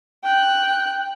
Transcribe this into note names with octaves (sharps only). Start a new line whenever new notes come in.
G5 F#6